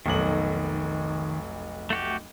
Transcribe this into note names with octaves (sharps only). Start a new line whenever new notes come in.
F1 B1 D#3 F#7
A3 F#4 G4